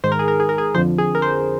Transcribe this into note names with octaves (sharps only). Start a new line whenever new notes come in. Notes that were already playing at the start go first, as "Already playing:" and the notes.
G#2 D#3 G#3 C5
A#4
G#4
A#4
G#4
A#4
G#4
F2 D3 F3 C5
G#4
A#4
C5